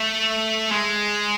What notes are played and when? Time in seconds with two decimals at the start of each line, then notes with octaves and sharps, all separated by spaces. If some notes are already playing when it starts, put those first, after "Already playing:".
Already playing: A3
0.71 G#3